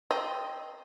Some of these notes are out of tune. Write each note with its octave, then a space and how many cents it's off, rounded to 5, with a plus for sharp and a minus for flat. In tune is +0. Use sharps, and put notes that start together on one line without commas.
C4 +0 D#5 +0